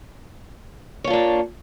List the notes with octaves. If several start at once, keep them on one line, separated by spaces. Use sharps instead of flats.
A#3 D4 F4 C#5